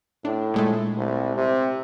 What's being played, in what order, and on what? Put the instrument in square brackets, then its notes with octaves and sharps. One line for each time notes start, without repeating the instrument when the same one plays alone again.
[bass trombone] A2 [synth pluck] D4
[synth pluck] A#2 G#3 A3
[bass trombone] C2
C3